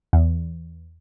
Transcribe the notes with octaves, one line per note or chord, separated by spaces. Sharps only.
E2